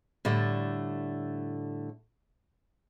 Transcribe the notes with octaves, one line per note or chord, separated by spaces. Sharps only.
A2 D3 G3 A3